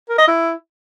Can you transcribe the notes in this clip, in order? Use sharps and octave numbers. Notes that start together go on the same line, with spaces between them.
A#4
D#5
E4